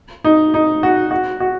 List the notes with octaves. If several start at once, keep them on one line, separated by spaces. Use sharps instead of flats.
D#4
D#4
F#4
F#4
F#4